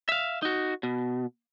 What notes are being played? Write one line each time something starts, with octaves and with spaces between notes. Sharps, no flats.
E5 F5
D#4 F#4
B2